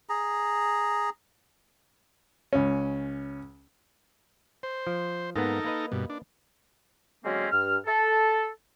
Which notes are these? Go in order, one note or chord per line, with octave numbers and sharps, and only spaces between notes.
G#4 A#5
C#2 C#4
C5
F3
G#2 A#3 B3 D#4 A4 A#4
A#3 B4 D#5
G2 B2
D4
D3 F#3 G#3 A#3 C4 C#4
G2 F6
A4